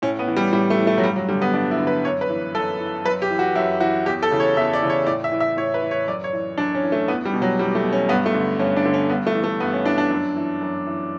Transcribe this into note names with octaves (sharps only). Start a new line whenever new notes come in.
A2 C#4
B3
E3
G3
A2 G3
A3
E3
A3
F#3
G2 G3
F#3
D3 G3
B3
G2 D4
E4
D3
B4
F#2 C#5
B4
E3
F#2 A4
E3
F#2 B4
G4
E3
F#4
F#2 E4
E3 F#4
E2 G4
A4
C#3 E3
C#5
E2 E5
D5
C#3 E3
C#5
A2 D5
E5
E3
E5
A2 C#5
B4
E3
C#5
F#2 D5
C#5
E3
F#2 D4
C#4
E3
A3
E2 B3
G3
B2
F#3
E2 G3
A3
B2
C#4
G2 B3
A3
D3
G2 C#4
D4
D3
C#4
G2 B3
A3
E3
A3
G2 B3
C#4
E3 D4
D4
F#2
E3
F#2
E3